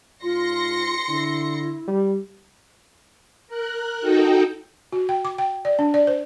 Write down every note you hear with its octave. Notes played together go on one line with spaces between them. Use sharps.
G#2 F4 C6 A#6 C#7
D3 E4
G3
A#4 F#6
D#4 F#4 A4 G5
F#4
G5
D6
G5
D5
D4
D5
C5